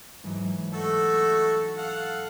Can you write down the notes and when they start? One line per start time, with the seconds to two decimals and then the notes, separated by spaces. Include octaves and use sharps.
0.24 G#2 E3 F#3
0.73 A3 F#4 A4
1.78 A4 F5 F#5